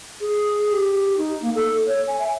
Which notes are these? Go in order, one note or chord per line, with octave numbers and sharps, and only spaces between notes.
G#4
G4
D#4
A#3
A4
C#5
G#5
E5